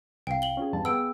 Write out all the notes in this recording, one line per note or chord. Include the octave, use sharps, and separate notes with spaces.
C2 F5 G5
F#7 G7
C#4 F4 G#4
E2 G2 A5
B3 G#4 G5 E6 D7